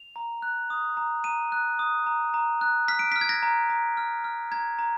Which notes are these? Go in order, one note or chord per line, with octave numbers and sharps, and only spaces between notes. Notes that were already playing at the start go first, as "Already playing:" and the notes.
Already playing: F7
A#5
F#6
D#6
A#5
A#5 D#7
F#6
D#6
A#5
A#5
F#6
F6 B6
D7
F6 B6
G#6
A#6
A#5
A#5
F6
F6
A#5 G#6
A#5